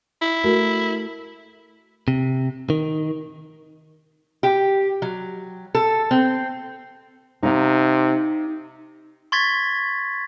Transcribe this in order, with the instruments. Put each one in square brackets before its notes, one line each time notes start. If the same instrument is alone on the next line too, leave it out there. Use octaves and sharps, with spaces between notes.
[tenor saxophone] E4
[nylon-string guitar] A3 F#4 A#4
[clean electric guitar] C3
D#3
[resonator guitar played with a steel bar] G4
F#3
A4
C4
[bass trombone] C3 [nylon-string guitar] D#4 F5
[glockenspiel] C6 C#6 G#6 A6 B6